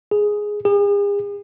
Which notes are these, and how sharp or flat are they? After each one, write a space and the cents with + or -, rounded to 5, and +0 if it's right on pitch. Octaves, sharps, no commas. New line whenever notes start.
G#4 +5
G#4 -40